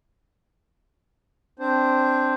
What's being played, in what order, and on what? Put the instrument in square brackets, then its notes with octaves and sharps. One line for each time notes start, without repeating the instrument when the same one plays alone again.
[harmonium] C4 D4 C5